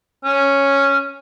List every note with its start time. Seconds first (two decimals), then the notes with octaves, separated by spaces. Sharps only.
0.25 C#4